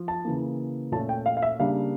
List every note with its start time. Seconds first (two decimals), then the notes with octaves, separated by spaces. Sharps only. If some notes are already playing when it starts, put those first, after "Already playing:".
Already playing: F3
0.08 A5
0.25 C#3 E3 A#3
0.92 A#2 A3 C#4 A5
1.09 G5
1.26 F5
1.37 F5
1.42 E5
1.59 C#3 G3 A#3 D4 F5